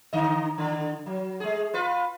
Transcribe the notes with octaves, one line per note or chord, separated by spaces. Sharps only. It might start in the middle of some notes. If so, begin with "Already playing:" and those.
D3 D#5
D3 D#3
F#3
G#3 G#4
F4 B4